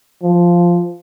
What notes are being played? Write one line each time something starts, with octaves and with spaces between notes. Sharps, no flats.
F3